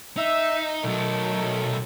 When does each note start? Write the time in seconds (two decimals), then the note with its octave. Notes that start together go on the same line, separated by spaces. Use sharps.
0.17 D#4 E5
0.84 B1 D#3 F#3 A3 A4